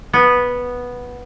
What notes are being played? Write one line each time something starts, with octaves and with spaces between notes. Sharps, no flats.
B3